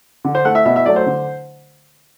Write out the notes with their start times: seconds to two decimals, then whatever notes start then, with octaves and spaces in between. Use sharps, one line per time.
0.24 D3
0.35 C5
0.45 A3 F#5
0.55 E5
0.65 B2 E5
0.76 E5
0.86 F#3 A3 D5
0.96 C5
1.06 D3